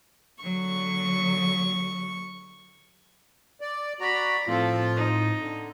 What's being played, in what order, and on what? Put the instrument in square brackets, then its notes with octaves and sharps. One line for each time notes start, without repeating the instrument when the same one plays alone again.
[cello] D3 F#3 [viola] C#6
[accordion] D5
[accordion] F#4 D5 [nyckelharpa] A#5 B5
[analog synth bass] A2 [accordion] F3 F4 [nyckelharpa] C4 A4
[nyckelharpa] D#4
[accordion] D3